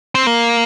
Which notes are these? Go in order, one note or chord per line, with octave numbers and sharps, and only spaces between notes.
C4
A#3